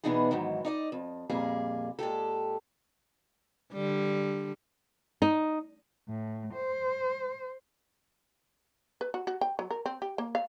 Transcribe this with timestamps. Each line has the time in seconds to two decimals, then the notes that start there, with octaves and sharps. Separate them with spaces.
0.04 B2 E3 B3 D4 D#4 G#4
0.31 E2 G#2 D#3 E3 F#3
0.65 D#4 D5 D#5
0.92 F2
1.29 F2 A#2 G3 A#3 G#4
1.99 A#2 G#3 G4 A4
3.73 D3 G3
5.22 D#4
6.08 A2
6.54 C5
9.01 B4
9.14 F#4
9.27 F#4
9.41 G5
9.59 F#3
9.70 A#4
9.86 C4
10.02 G4
10.18 A#3
10.35 F5